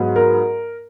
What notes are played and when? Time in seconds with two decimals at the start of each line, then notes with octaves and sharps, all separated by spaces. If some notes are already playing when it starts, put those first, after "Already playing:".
Already playing: G#2 F#3 B3
0.16 A#4